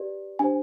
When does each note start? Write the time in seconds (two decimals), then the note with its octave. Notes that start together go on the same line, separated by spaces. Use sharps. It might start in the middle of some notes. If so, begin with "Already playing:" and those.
Already playing: G4 B4 D5
0.39 D4 G4 C5 G#5